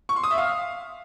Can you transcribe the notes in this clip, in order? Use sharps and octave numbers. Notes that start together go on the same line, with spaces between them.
C#6
C6
D#6
E5
F5